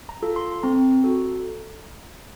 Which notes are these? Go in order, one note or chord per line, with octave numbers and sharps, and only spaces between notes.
A#5
F4 A4
C6
C4 A#5
F#4 A4